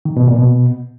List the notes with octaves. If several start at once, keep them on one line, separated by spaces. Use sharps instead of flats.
D#3
B2
A#2
B2